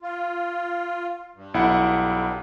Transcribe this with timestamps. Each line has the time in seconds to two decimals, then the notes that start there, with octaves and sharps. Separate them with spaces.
0.01 F4
1.35 G2
1.54 B1 E4 F#5